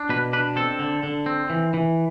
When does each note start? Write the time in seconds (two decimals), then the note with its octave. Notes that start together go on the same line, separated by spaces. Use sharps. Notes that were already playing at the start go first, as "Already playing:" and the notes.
Already playing: D4
0.09 B2 B4
0.33 D4 B4
0.56 C4 A4
0.79 D3
1.03 D3
1.26 C4
1.50 E3
1.74 E3